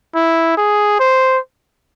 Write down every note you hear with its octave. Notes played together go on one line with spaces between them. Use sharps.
E4
G#4
C5